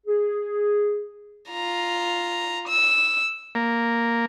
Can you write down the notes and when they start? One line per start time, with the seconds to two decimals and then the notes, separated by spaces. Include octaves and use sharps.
0.06 G#4
1.49 F4 A#5
2.68 E6
3.55 A#3